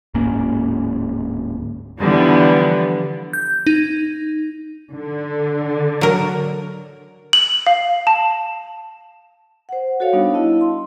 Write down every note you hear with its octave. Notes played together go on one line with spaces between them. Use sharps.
D1 G#2 A#3 C#4
D3 E3 F3 G3 B3
G6
D#4
D3
F#3 A#4
F#7
F5
A5
C5 F#5
F#4 A4 C#5 F5
G3 B3 D4 D#4
E4 D#5 A5
C6